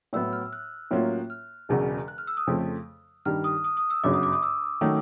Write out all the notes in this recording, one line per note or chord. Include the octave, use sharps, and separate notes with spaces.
A2 F#3 B3 E6
F6
F#6
A2 F#3 A#3 C#4 F4
F6
E1 E2 C#3 F#3
F#6
F6
E6
D#6
F2 C#3 F3 A3
G2 D#3 G3 F6
D#6
D#6
D#6
E6
G1 F#2 C#3 F#3 D6
D#6
D6
D#6
E6
D#3 F#3 A3 C#4